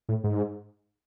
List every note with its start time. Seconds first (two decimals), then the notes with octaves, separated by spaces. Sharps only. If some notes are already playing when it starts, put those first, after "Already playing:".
0.09 A2
0.24 G#2